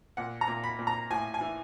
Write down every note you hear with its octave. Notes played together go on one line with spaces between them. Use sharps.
A#2 F#5
A#5
A#2
B5
A#2
A#5
A2 G#5
G#5
E3